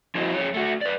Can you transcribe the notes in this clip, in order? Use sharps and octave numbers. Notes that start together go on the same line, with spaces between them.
F3 E4 F#4 C5 D#5
F2 G#4 C#5
A3 F#4
B4 D5